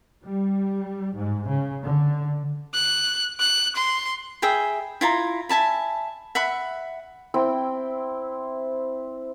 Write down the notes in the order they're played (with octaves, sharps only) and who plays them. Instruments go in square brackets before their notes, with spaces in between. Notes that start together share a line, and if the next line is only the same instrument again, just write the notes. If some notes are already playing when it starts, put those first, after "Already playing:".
[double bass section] G3
G#2
C#3
D3
[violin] F#6
F#6
C6
[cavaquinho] G#4 E5 G5 B5
E4 F4 A#5
E5 G#5 A5 B5
E5 F#5 B5
[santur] C4 E4 G5